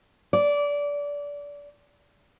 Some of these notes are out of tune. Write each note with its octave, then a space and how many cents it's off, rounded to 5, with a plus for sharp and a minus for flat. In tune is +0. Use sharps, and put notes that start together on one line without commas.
D5 -25